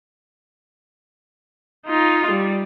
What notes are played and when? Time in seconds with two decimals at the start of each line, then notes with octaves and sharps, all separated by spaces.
1.87 D#4 F4
2.31 G3